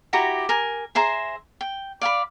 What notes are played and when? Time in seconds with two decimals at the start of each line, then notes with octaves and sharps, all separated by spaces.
0.13 E4 F#4 G4 A#5
0.49 A#4 G#5
0.95 G#4 C5 E5 A#5
1.61 G5
2.01 D5 F5 G#5 B5